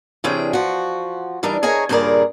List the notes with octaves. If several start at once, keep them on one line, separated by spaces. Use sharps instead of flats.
C3 E3 C#4 D4 G#4 G5
F3 F#4
E3 G3 D4 D#4 A#4
G#4 A#4 C#5 D#5 G#5 A#5
G2 A#2 C#3 G#4 A#4 D5